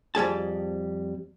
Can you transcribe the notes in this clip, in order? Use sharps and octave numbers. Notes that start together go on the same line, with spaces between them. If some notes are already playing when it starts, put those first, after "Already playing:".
F2 G3 G#4 A5